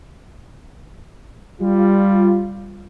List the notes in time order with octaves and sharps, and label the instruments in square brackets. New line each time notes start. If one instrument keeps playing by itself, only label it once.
[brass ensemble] G3 F4